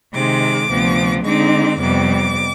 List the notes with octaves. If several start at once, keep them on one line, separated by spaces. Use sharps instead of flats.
C3 D#3 G#3 D6
D2 C3 F3 B3
D3 G#3 C4 D#4 D6
F2 C3 G3 B3 D6